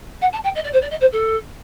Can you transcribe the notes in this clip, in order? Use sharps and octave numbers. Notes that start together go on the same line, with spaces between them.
F#5
A5
G5
D#5
D5
C5
D5
D#5
C5
A4